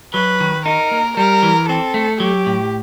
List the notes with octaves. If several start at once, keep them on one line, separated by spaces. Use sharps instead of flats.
F#3 B4
D#3
D#4 A#4
A#3
G3 A#4
E3
C4 A4
A3
F#3 G4
A2